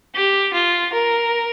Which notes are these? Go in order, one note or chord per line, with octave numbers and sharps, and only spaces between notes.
G4
F4
A#4